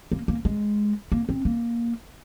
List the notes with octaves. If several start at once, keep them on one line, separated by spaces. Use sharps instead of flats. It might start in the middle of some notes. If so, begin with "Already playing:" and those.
A#3
A#3
G#3
A#3
C4
A#3